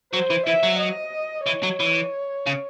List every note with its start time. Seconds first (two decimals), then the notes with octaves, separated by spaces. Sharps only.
0.13 F#3 C5
0.30 E3
0.47 E3 E5
0.63 F#3
0.80 D#5
1.46 E3 C#5
1.63 F#3
1.80 E3
2.47 C#3